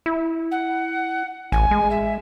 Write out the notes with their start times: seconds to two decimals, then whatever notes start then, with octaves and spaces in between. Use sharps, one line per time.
0.06 E4
0.51 F#5
1.52 A1 G#5
1.71 G#3
1.90 E5